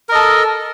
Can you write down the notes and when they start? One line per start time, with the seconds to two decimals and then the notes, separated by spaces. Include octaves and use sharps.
0.09 A#4
0.12 D#5
0.15 A4